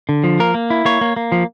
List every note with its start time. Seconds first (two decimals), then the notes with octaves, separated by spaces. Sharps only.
0.09 D3
0.24 F3
0.40 A#3 A#4
0.54 A#3
0.70 E4
0.85 A#3 C#5
1.01 A#3
1.16 A#3
1.32 F3